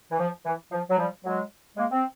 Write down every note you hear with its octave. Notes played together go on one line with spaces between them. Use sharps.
E3
F3
E3
F3
F#3
F3 G3
F#3 G#3
G#3 A#3
C4